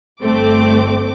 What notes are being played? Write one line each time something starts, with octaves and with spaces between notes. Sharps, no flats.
G1 A3 C4 D6